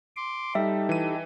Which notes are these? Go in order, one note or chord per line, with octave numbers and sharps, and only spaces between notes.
C6 D6
G3 D#4 G4 A4 E5
E3 D#7